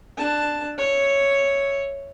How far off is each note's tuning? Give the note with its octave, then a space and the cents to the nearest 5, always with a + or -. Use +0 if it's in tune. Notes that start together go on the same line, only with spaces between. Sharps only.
D4 +15 A5 +0
C#5 +0 E5 +0